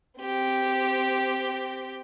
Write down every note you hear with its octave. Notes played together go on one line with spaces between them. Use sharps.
C4 G4